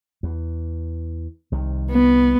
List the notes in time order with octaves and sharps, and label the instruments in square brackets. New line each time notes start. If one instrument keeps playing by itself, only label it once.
[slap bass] E2
C2 C3 D#3
[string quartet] B3